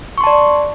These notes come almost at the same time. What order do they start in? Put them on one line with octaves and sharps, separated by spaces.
C#6 C6 A5 D5